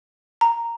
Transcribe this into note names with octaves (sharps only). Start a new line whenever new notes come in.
A#5